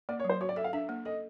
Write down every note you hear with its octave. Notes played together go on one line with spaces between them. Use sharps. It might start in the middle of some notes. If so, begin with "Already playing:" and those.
A#3 D5
C#5
F#3
C5
F#4 C#5
D5
A4 E5
F5
D4 E5
A#3
A4 D#5